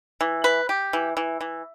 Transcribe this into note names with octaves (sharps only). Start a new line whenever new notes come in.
E3
B4
G4
E3
E3
E3